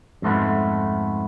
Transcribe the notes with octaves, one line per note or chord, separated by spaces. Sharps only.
F2 G#2 A3 B3